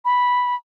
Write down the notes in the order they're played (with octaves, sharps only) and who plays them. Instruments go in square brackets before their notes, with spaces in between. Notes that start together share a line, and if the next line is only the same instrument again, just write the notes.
[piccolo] B5